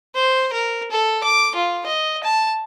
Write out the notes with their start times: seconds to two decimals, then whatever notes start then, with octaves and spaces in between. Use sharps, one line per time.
0.15 C5
0.53 A#4
0.91 A4
1.23 D6
1.55 F4
1.86 D#5
2.23 A5